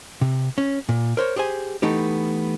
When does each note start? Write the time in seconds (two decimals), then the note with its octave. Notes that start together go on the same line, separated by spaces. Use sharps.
0.21 C3
0.58 C#4
0.89 A#2
1.17 A#4 C5 C#5
1.36 G4 G#4 C5 G#5
1.82 E3 A3 B3 D#4 G4